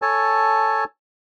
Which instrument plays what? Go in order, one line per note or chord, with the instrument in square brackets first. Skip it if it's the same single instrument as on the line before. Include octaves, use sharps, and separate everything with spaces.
[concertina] A4 C#5 G#5 A5